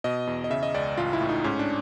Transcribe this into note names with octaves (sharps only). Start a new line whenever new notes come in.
B2 D#5
E2
D#5
C#3 E5
D#5
C#2 D5
A1 F4
E4
A2
D#4
G#2 C#4
D4